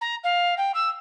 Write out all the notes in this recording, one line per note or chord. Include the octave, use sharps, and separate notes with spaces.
A#5
F5
G5
E6